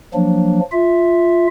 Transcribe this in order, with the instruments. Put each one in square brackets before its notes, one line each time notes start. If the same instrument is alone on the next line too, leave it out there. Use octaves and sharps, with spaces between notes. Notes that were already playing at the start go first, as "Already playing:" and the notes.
[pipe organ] F3 F#3 A#3 D4
F4 E5